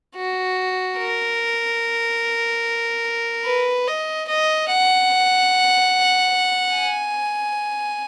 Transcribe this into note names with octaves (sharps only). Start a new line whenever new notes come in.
F#4
A#4
B4
D#5
D#5
F#5
G#5